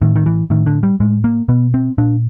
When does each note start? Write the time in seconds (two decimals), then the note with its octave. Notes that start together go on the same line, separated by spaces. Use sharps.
0.02 A2 D#3
0.16 D#3
0.26 E3
0.50 A2 D#3
0.66 D3
0.83 G3
1.00 A2 G#3
1.24 A#3
1.48 B2 B3
1.74 C4
1.98 A#2 D4